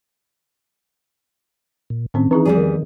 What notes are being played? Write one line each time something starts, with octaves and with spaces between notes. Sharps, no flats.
A#2
A2 D#3 C4 C#4
E3 C4 D#4 E4 G#4
E2 F3 G3 G#4
D#3